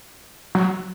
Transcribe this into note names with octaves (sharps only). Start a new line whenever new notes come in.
F#3